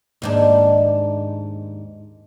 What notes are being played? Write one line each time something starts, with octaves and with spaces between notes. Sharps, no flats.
D#2 G#2 D4